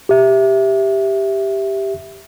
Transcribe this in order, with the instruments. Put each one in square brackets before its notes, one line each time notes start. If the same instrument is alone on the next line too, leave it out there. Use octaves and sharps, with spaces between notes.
[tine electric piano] G4 E5